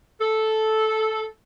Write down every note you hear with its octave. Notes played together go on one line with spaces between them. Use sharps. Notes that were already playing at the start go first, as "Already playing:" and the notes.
A4